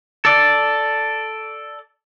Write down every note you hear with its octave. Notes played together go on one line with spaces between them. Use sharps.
A4 D5